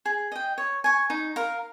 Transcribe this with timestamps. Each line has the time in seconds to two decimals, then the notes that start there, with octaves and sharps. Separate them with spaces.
0.05 G#4
0.32 D#5 G5
0.58 C#5
0.84 G#5 C#6
1.10 D#4
1.36 A#4 F5 A#5